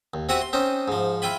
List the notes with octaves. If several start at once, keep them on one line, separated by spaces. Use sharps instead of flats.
D#2
C4 F#4 G4 E5 F#5 G#5
C6
C4 C#4 D#4 C5
G#2 F3
E4 F4 G5 G#5 B5